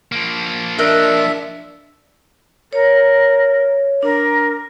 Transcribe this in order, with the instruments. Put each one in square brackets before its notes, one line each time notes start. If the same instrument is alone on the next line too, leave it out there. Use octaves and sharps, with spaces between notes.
[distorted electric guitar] F3 A#3
[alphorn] D4 [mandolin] A#4 D#5 F#6 [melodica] E5
[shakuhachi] A#4 [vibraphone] C#5
[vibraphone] D4 [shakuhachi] A#4